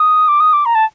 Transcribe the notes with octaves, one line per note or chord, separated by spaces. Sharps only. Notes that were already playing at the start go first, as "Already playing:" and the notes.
Already playing: D#6
D6
D#6
D6
A#5
A5